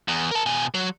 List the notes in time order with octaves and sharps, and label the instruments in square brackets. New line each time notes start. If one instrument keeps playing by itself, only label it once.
[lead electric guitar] E2
A#4 A5
B2 G#5
F#3